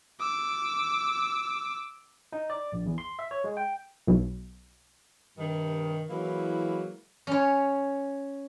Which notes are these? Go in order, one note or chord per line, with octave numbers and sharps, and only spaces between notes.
D6 E6
D#4
D5
A#1
E2
C6
E5
C#5
G#3
G5
B1
G2 C3 D#3
E3 F#3 G#3 A#3 E4
C#4 C#5